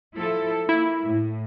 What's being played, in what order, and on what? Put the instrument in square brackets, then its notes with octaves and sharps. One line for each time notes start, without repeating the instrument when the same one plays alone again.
[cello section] F3 E4 A4
[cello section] A#3 [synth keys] E4
[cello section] A2